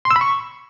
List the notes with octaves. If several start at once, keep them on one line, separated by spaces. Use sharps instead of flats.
C6
E6
B5
C#6